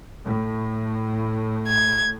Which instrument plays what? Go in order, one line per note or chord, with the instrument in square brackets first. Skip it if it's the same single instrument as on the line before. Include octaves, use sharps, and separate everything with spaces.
[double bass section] A2
[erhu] G#6